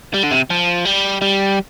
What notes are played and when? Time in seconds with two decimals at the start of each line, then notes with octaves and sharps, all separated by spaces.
0.14 G3
0.23 D3
0.31 C3
0.50 F3
0.85 G3
1.22 G3